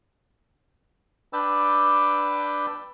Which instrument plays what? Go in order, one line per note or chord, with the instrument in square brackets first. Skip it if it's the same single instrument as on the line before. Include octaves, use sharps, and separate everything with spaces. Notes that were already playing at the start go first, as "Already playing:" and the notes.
[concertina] D4 B4 D5 G5 D6 E6